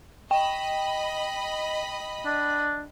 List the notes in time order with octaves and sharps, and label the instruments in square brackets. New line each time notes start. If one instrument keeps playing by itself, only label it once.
[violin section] D#5 B5 [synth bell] G5
[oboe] D4